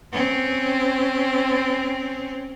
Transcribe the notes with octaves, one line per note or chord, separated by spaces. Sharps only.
C4 C#4